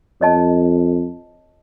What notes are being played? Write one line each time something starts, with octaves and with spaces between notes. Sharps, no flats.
F2 C#5 D#5 A5